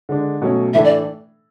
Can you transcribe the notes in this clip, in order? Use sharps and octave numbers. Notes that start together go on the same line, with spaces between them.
D3 G#3 D4
B2 F#3 A3 C#4
A2 E3 A3 D4 A4 E5
D5